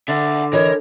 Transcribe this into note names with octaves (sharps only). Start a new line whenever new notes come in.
D3 E5 F#5
E3 A#4 C#5 D#5